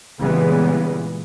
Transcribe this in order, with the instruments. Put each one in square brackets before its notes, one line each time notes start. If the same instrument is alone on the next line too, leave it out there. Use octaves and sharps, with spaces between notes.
[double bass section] A#2 C#3 E3 G3 G#3 B3